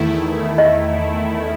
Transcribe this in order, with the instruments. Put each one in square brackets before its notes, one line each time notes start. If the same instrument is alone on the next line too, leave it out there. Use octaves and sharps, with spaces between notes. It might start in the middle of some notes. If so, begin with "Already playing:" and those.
Already playing: [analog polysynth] E2 D#3 A3 E4
A3
E2
[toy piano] D#5
[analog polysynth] D#3 [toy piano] E5